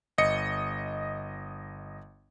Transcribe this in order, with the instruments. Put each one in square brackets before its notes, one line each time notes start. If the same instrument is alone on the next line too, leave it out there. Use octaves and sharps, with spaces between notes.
[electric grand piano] G1 D#5 C#7